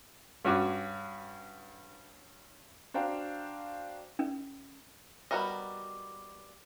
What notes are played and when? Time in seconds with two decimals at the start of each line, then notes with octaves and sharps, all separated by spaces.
0.45 G2 C#4 F#4 D6
2.94 D4 F#4 C5 F5 G5 A#5
4.19 C#4
5.31 G3 B3 F#4 A#4 D#5